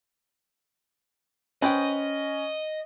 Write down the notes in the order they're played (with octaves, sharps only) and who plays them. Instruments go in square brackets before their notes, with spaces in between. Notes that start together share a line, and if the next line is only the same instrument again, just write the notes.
[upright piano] C#4 [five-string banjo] B4 C5 G5 [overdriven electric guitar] D#5